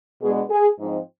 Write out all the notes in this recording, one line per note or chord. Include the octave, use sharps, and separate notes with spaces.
B2 G#3 B3 D4 G#4
G#4
G#2 F3 C4 D#4